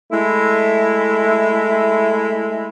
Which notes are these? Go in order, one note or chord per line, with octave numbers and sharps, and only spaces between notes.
G#3 A3 E4